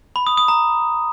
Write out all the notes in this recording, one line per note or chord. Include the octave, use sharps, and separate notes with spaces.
B5
D#6
D#6
A#5